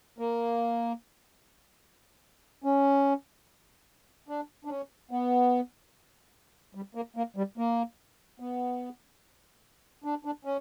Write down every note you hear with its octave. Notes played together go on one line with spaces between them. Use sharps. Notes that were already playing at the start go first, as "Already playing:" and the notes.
A#3
C#4
D4
D4
C#4
B3
G3
A#3
A#3
G3
A#3
B3
D4
D4
C#4